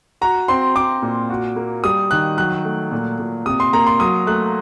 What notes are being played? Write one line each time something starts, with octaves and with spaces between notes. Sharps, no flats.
F#4 A#5
C4 C6
C4 D6
A#2
F#4
A#3
G3 D#6
D#3 F#6
F#3 F#6
A3
A#2
A#2
C3 D#6
C6
A#3 A#5
C6
F#3 D#6
A3 F#6